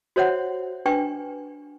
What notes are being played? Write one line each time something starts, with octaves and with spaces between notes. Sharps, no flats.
F#4 C5 C#5 E5 F#5
D4 B4 G5 G#5 C#6